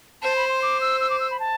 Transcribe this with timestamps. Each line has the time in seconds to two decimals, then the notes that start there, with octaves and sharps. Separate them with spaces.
0.22 C5 A5
0.36 B5
0.48 C6
0.62 D6
0.81 E6
1.01 E6
1.10 D6
1.20 E6
1.31 B5
1.40 A5